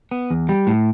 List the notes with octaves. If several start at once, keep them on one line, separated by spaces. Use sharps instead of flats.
B3
E2
G3
A2